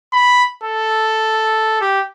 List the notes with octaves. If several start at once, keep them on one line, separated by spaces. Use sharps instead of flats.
B5
A4
G4